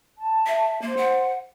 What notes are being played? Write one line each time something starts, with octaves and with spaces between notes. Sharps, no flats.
A5
E5
A#3 C5
F#5